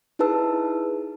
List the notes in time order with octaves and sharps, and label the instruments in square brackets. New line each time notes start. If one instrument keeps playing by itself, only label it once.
[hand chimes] D#4 E4 G#4 B4 A5 E6